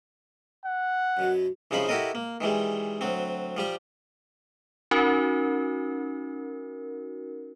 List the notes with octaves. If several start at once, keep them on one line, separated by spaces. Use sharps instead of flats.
F#5
F#2 B2 F#3
C2 C#3 F3 D#4 C5 B5
E4 F#4 G4 A4 A#4 D#5
A#3
D#3 E3 G3 G#3
D2 F#3 C4
F3 G3 G4
C#4 D#4 F#4 A#4